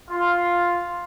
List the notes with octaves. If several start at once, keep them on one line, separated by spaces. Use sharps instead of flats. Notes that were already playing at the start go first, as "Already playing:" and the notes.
F4